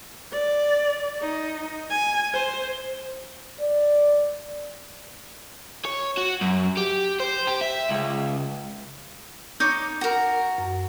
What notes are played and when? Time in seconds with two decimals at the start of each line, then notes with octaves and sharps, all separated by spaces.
0.32 D5
1.21 D#4
1.90 G#5
2.33 C5
3.60 D5
5.85 C#5
6.17 F#4
6.41 F#2
6.77 G4
7.20 C5
7.47 G4
7.61 E5
7.89 C#2
9.60 D#4 C#5 D6 G6
10.01 F#4 A#4
10.58 F#2